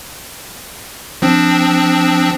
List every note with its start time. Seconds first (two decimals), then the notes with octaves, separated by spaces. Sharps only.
1.22 F3 C4 D4